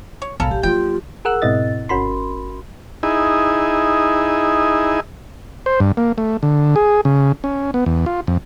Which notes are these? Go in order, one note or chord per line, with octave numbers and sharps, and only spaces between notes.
C#5
B1 G#2 C#4 A4 A#4 F5 B5
A1 G4
F#3 A#3 F4 G5
G#4 A#4 F#5 E6 F#6
G#2 B2 C4 E4 D#5 A6
G1 C#4 F#4 A#4 B5 C6
D#4 E4 G#4
C5
G2
A#3
A3
D3
G#4
C#3
C#4
B3
E2
F4
F2